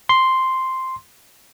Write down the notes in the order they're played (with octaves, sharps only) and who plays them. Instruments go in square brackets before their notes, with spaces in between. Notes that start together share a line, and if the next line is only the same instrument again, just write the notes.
[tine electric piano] C6